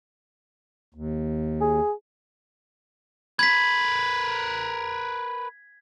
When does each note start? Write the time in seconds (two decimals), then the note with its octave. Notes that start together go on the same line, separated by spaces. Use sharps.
0.94 D#2
1.61 G#4
3.39 A#4 B4 G#6 B6